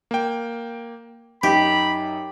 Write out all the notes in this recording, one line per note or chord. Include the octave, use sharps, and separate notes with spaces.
A#3 G5
F#2 D#4 G4 B5